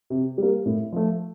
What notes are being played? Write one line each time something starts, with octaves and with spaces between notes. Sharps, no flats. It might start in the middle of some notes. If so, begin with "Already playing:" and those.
C3
G3 A#3
A2
F3 A3